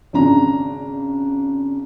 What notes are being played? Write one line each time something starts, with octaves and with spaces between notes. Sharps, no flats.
G#1 C#3 D4 A#5